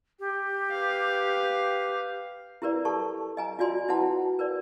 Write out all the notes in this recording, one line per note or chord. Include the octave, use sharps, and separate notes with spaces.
G4
B4 F5
E4 G4 A#4 B4 D5
G4 A4 A5 C#6
D#5 G#5 A#5
F4 F#4 D5 G#5 C6
E4 F#4 B4 F#5 A5
A#4 B4 D5